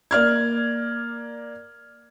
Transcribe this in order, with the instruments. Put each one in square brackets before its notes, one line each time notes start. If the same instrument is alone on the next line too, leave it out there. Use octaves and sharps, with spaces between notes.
[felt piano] A#3 D5 F6 G#6